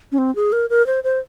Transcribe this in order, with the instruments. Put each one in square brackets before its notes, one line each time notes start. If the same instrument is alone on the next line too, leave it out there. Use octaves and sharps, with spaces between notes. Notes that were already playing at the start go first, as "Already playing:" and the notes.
[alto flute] C#4
C4
G#4
A#4
A#4
C5
C5